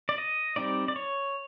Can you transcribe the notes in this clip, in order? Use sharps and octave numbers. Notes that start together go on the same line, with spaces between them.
D5
D#5
G3 C4 D#4 D5
D5
C#5